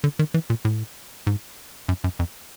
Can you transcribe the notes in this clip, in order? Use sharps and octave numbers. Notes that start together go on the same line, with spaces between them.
D3
D#3
E3
A#2
A2
G#2
F#2
F#2
F2